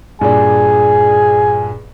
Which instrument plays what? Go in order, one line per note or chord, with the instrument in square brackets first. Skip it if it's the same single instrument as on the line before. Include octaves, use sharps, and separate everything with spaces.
[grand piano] G2 A#2 D4 [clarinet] G#4 [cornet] G#5